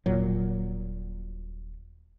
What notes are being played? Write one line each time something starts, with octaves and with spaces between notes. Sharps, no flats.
D#1 A#2 F#3